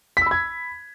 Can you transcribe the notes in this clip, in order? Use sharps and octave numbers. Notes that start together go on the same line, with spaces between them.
B5 E6 G#6 B6